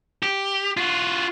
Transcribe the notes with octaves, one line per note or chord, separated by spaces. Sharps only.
G4
F4 F#4